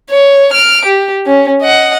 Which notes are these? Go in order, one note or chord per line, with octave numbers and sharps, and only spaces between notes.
C#5
F6 D7
G4
C#4
D#5 F#5